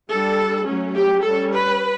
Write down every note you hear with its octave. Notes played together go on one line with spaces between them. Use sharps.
G3 D4 A4
F#3 A3 C#4
G4
G3 C#4 A4
B4